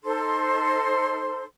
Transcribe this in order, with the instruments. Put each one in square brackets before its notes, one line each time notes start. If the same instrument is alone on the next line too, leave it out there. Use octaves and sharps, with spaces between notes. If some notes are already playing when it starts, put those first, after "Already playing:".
[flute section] D#4 A4 C5 C6